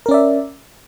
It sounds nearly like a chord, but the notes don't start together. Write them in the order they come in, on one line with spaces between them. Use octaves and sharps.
A#4 C#4 D5 E5